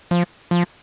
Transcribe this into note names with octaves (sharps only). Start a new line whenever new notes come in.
F3
F3